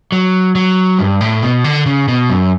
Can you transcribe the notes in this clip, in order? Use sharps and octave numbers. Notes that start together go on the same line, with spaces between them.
F#3
F#3
G2
A2
B2
D3
C#3
B2
F#2